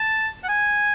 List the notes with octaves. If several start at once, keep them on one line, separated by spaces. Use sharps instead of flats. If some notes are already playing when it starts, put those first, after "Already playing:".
Already playing: A5
F#5
G#5